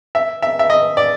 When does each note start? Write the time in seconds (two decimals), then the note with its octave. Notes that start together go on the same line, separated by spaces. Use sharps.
0.15 E5
0.42 E5
0.59 E5
0.70 D#5
0.97 D5